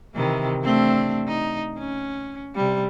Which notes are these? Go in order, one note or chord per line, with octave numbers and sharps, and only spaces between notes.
C3 D#3 E3
A3 C4 D4
D#4
C#4
C3 G3